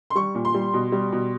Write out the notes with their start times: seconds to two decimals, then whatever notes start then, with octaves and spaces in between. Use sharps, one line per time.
0.10 C6
0.15 G3 C#6
0.35 A#2
0.45 C6
0.54 G3
0.74 B2
0.92 G3
1.12 B2